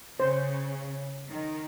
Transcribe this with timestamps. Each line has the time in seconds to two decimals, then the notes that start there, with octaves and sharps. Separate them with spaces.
0.20 C#3 C5
1.30 D#3